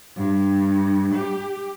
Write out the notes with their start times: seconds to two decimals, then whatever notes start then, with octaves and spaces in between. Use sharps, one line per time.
0.17 G2
1.15 G4